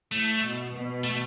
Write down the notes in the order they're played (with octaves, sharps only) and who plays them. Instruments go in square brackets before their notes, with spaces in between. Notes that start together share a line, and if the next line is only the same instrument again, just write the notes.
[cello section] A2 [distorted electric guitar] A3
[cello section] B2
B2
[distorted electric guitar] A3